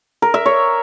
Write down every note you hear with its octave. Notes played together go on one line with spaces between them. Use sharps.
A#4
E5
C#5